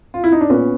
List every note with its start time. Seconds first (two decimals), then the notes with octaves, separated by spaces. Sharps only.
0.14 F4
0.24 E4
0.32 D#4
0.41 D4
0.50 A#2 B3 C#4